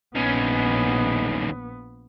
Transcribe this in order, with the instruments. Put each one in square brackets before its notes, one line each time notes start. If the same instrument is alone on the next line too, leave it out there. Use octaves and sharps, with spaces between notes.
[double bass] A#1 B3 [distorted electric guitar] D#2 C#4